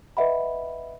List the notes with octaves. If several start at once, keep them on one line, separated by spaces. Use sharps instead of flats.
B4 D#5 E5 F#5 B5